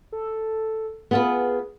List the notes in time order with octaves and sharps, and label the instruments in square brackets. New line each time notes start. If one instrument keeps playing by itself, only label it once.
[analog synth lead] A4
[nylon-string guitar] B3 F4 B4 [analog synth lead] G#4